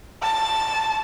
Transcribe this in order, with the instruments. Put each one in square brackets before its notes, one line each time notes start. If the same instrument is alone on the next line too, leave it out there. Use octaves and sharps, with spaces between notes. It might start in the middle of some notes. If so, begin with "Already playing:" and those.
[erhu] A5